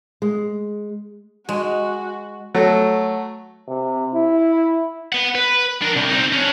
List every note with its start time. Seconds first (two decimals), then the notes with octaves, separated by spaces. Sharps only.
0.22 G#3
1.49 G#3 F#4
2.55 F#3 A3
3.68 C3
4.14 E4
5.13 B4 F#5
5.35 B4
5.82 D4 A#4
5.96 C2
6.10 C4 D#4
6.32 C#4 D4